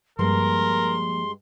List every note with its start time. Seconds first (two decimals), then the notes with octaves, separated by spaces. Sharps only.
0.19 G2 F3 G#3 A#3 A#4 C6